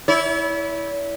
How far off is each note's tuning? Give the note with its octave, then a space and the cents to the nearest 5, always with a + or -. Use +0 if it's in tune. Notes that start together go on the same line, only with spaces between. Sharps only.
E4 -15 C#5 +45